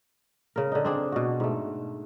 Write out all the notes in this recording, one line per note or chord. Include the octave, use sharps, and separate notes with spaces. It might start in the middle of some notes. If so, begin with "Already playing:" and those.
C#3 A#4
D3 D#4
C4 D4 G#4
B2 F#4
G#2 A3